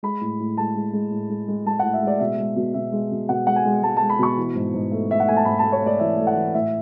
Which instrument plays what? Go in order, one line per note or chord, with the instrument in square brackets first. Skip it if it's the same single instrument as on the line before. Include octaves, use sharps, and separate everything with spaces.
[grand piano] G#3 B5
A2
A2
G#3 A5
G#3
G#3
A2
G#3
G#3
G#3 A5
A2 F#5
E5
G#3 D5
B2 E5
G#3
B2
B2 E5
G#3
B2
B2 F#5
G#3 F#5
G#5
G#3
G#3 A5
G#3 A5
B5
B2 C#6
E3
G#2
G#2
A3
A3 E5
F#5
A3 G#5
A5
G#2 B5
A3 A5
C#5
A3 D5
E3 E5
A3
F#5
E3
A2 E5